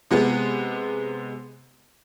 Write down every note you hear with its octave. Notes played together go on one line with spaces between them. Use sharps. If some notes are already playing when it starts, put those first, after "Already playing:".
C3 G#3 B3